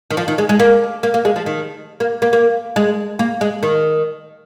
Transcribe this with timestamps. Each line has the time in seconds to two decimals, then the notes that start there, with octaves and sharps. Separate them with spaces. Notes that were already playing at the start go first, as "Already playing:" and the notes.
0.10 D#3
0.17 F3
0.28 D#3
0.38 G#3
0.49 G#3
0.60 A#3
1.03 A#3
1.14 A#3
1.25 G#3
1.36 F3
1.46 D#3
2.00 A#3
2.22 A#3
2.33 A#3
2.76 G#3
3.19 A#3
3.41 G#3
3.63 D#3